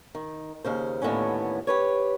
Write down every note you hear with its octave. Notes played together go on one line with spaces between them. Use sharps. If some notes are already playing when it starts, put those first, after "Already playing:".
D#3
D#2 C#3 C5
D#2 A2 D3 B3 C#4
G4 B4 C#5